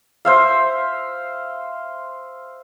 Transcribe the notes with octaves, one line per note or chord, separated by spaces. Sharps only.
C5 E5 F5